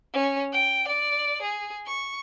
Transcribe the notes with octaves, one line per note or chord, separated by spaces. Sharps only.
C#4
G5
D5
G#4
C#6